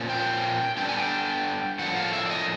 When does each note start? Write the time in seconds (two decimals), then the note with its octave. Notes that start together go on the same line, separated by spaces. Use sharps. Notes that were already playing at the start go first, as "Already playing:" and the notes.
Already playing: A#2 F3 A#3 C#4
0.10 G5
0.77 D3 G3 B3 D4 G5
0.89 G#5
0.99 G5
1.79 A2 F3 A#3 D4 F#5
1.96 F5
2.13 E5
2.26 D5
2.30 D#5